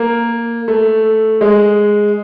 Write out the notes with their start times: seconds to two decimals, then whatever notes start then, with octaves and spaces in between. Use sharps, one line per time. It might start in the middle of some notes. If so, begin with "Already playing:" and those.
Already playing: A#3
0.68 A3
1.41 G#3